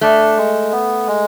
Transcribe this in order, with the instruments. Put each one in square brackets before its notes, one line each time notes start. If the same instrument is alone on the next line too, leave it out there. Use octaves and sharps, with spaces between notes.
[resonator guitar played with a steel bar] A3 [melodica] D4
[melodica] G#3
B3
G#3